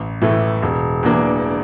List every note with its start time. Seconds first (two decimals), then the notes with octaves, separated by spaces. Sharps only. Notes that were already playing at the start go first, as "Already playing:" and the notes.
Already playing: A1
0.22 A2 E3 A3
0.63 E1
1.03 E2 E3 A#3 D4